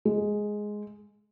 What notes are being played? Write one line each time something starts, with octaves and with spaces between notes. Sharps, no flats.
G#3